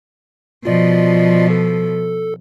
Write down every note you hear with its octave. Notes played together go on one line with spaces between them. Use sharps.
B2 F3 F4 D5 D#5
A4